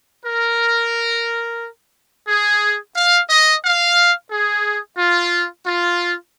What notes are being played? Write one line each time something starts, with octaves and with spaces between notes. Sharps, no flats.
A#4
G#4
F5
D#5
F5
G#4
F4
F4